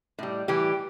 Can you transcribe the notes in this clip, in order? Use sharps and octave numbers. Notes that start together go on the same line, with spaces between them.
A2 G3
A2 E3 G3 G4